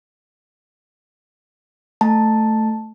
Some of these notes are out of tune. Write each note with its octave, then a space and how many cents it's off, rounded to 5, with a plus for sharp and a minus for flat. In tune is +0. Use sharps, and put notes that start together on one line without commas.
A3 +0 A5 +0